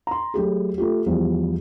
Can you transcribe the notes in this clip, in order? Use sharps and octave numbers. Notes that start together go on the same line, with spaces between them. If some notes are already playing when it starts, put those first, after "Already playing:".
A#5 C6
F#3 A3 G4 G#4
A3 F4 G4
E2 F3 G3